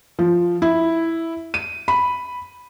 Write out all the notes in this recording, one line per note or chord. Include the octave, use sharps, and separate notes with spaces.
F3
E4
D#7
B5